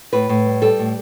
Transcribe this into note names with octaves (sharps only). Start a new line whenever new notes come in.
A2 B4
A2
G3
G3 A4
A2